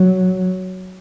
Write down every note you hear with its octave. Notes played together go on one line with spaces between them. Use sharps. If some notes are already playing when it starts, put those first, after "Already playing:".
Already playing: F#3